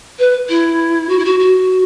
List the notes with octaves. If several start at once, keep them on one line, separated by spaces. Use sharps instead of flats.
B4
E4
F#4
E4
F#4
F#4